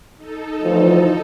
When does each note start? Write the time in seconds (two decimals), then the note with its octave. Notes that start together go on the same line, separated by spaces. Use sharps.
0.17 D#4 A4
0.62 D2 E3 F3